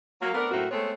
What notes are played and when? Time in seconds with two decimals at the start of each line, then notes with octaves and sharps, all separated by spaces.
0.21 F#3 A#3
0.34 A3 B3 C4 D4 A#4
0.51 F#2 A2 A3 A#3 C4 F#4
0.71 G#3 A3 B3 C4 A4 C#5